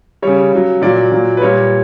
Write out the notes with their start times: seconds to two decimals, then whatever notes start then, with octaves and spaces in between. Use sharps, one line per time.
0.22 C#3 G3 C#5
0.53 C#3 F#3
0.82 A#2 F#3 D5
1.12 A#2 F#3
1.37 B4
1.41 A#2 G3 C#5